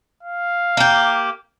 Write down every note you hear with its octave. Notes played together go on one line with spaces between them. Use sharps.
F5
A#3 G4